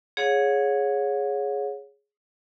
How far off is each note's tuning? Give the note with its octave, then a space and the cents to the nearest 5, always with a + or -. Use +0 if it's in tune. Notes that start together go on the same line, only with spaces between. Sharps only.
G#4 +0 C#5 +0 F#5 -45